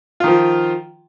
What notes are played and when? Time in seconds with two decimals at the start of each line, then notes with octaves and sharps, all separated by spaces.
0.20 F4
0.24 D#3
0.28 F3